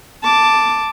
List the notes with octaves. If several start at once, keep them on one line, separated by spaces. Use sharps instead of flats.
A5 D6